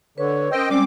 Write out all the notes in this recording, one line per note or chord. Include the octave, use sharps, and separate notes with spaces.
D3 B4 C#5
C#4 A#4 C5 D#5 G5 E6
G3 G#3 C4 C#4 D5 D6